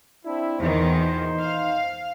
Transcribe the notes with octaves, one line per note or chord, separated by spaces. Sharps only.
C4 D4 E4
E2 A#2 D#3 D#4 C5
F5